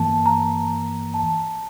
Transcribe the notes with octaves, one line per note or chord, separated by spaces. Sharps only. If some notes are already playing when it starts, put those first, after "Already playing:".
Already playing: G2 E3 A#3 A5
A#5
A5